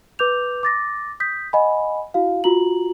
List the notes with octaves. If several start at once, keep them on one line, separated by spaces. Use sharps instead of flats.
B4 D6 G6 F7
D6 A6 A#6
D#6 G6 B6
D#5 F#5 G#5 B5
E4 F#4 F5
F4 F#4 A#5 F#7